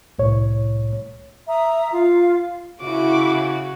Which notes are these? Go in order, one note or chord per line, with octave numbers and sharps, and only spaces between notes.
C2 A2 C#5
E5 A#5 D#6
F4 F5
C#3 E4 F#4 D6